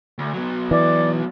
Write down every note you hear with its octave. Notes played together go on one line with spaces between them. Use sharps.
D2
F#3 B3
E3 D5